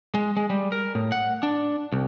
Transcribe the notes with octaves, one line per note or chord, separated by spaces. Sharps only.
G#3
G#3
G3
A#4
A2
F#5
D4
C2